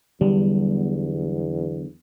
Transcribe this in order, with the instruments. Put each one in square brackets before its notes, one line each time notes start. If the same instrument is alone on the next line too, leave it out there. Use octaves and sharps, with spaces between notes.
[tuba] E2 [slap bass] D3 F#3 B3 [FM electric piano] G3